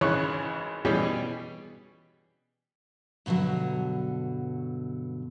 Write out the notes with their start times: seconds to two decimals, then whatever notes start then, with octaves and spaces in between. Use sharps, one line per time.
0.01 G#1 C#3 E3 C#5 C#6 F#6
0.85 B2 E3 G3 C#4 G4 G#4
3.26 G2 B2 D3 E3 F#3